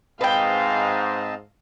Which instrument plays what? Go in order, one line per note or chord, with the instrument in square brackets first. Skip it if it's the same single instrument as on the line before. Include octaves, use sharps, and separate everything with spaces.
[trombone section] G#2 [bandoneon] C4 D#5 A5 [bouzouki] B4 G5 [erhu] F5